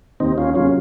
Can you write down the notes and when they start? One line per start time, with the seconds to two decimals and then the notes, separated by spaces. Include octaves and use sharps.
0.20 D#2 C4 D#4
0.38 C#4 F4
0.55 C#3 F#3 C#4 F4